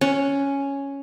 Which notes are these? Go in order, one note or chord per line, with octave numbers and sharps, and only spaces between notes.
C#4